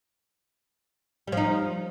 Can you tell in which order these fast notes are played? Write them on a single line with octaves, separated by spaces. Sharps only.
G3 F3 D#4